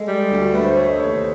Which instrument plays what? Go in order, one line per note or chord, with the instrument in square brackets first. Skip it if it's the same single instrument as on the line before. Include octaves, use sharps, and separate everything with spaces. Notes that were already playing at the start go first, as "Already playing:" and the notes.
Already playing: [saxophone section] G#3 [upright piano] A4
[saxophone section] G3
D2
[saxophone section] A3 [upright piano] B4
[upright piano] C5
[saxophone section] A3 [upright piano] C#5
[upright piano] D#5
[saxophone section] D#2 [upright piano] C#5